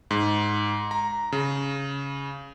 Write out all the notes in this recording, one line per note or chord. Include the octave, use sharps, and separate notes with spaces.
G#2
A#5
C#3